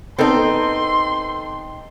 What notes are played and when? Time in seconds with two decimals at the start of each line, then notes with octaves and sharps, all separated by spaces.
0.18 B3 C4 D#4 A4 C6